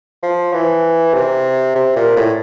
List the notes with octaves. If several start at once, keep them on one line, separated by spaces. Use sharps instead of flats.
F3
E3
C3
C3
A#2
A2